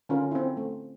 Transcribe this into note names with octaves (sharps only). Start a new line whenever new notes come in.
D3 C#4 F4 A#4
C4 E4
A3